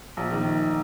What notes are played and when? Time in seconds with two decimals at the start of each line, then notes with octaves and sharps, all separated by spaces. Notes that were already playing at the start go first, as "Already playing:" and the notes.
0.17 A#1
0.32 D#3 A#3